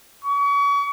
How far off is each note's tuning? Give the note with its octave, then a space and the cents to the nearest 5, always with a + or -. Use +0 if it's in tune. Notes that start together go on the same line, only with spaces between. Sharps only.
C#6 +35